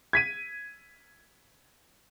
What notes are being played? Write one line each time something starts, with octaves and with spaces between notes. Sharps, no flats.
G#6 B6 D#7